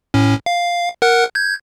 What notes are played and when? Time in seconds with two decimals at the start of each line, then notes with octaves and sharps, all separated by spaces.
0.14 A2 C#4
0.46 F5
1.02 A#4 F#5 F#6
1.35 G6 G#6